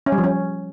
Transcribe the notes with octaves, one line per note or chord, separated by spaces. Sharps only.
C#4
G3
F3
C#4